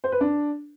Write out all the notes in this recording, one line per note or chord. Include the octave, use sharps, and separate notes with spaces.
C5
B4
D4